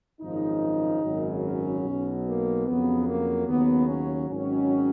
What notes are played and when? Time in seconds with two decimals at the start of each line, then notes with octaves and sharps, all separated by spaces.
0.20 G#1 F#2 C#3 F3 D#4
1.02 G#1 F#2 C#3 F#3
1.44 C#4
1.84 B1 B2 F#3
2.26 A#3
2.67 F2 C#3 F#3 B3
3.08 A#3
3.48 D#2 C#3 F#3 B3
3.89 C#4
4.30 G#1 G#2 D#3 F#3 C#4